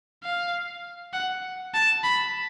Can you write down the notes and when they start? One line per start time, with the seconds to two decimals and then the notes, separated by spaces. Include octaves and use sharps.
0.23 F5
1.13 F#5
1.74 A5
2.04 B5